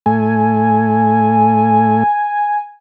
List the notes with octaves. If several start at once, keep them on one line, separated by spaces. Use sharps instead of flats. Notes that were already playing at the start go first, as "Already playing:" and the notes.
A2 A3 G#5